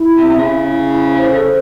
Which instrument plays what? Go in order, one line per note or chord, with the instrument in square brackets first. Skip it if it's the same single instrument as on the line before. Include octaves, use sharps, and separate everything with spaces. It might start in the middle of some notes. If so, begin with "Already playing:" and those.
Already playing: [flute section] E4
[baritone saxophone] C3 [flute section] E5
[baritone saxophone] C3
[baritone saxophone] C#3 [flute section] E4
[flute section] E4
E4
C5
A4